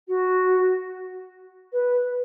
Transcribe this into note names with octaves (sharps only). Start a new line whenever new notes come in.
F#4
B4